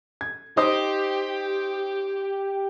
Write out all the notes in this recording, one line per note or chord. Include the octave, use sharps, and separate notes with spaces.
G#6
D#4 G4 C5 D#6